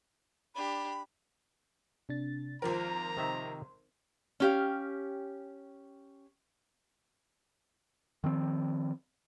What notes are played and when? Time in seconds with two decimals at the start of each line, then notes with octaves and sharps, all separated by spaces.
0.55 D4 G4 B5
2.09 C3 D4 A6
2.62 G#1 F3 A#4 C5 A#5 C6
3.17 C3 D#3 E5
4.40 C#4 G4 F5
8.24 D#3 F3 C4